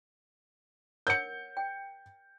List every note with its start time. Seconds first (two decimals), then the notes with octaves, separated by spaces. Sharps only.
1.07 A#4 C#5 F#5 G6 C#7
1.57 G5